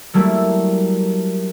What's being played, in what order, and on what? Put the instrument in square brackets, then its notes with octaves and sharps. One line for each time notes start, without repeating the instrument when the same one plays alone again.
[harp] F#3 G3 A3 A#3 E4